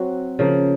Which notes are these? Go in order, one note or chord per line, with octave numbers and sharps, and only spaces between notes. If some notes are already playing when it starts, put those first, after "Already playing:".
Already playing: F#3 C4 F#4
C#3 F3 A#3